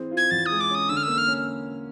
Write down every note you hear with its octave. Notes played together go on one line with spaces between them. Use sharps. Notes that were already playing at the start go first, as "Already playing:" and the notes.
Already playing: E3 C4 G#4
F4
G#6
E2 A6
G#3 D#6
D6
C#4 D#6
D3 E6
F6
A#3 E6
F6
C#4